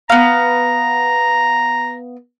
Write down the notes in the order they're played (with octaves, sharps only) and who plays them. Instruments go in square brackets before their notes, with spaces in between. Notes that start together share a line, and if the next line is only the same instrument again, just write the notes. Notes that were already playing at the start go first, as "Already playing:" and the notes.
[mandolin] B3 F5 [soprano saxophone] A#5